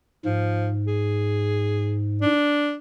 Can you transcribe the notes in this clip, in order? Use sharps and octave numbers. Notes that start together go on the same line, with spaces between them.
G#2 F3
G#4
D4